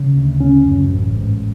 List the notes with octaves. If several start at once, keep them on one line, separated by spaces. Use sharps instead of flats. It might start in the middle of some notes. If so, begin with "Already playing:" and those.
Already playing: C#3
D2
C#3 C#4
F#2
A1
G#2